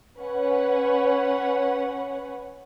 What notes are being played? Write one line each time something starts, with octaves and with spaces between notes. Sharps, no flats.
C#4 B4 C#5 F#5